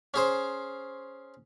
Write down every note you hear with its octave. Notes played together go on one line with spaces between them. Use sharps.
C#4 G#4 C5